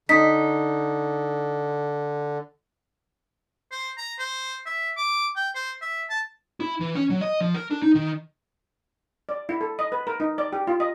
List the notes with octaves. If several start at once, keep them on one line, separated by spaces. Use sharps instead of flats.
D3 D#4 B6
C5
A#5
C5
E5
D6
G5
C5
E5
A5
E4
E3
C#4
F#3
D#5
F3
A#4
D4
D#4
D#3
D5
E4
A4
D#5
B4
A#4
D#4
D5
G4
F4
D#5